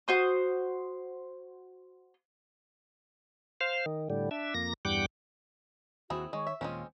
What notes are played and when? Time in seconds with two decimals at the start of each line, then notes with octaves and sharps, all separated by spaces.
0.08 F#4 C5 D#6
3.61 C5 F5
3.86 D#3
4.10 A2 D3 G3
4.31 D4 E5
4.54 F2 A#3 A#6
4.85 E2 G2 G3 F#5 G5 D6
6.10 D#2 C4 E4 F#4 G#4
6.33 D#3 G#3 C#5 C#6
6.47 E5
6.61 D#2 A#2 G#3 C4 C#4 F4